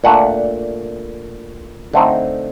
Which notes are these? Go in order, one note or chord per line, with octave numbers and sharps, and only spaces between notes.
A#2 A3 D4 F#5
D3 A3 C4 D#4